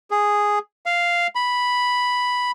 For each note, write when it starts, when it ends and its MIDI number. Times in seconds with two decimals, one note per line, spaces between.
0.11 0.59 68
0.86 1.27 77
1.35 2.51 83